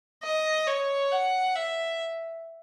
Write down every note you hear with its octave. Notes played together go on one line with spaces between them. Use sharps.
D#5
C#5
F#5
E5